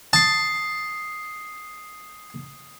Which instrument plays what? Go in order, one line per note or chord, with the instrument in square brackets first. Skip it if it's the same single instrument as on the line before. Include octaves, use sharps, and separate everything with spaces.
[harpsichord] A5 [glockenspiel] D#6 C7